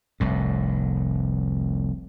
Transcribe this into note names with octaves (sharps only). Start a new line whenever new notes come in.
F1 C2 A2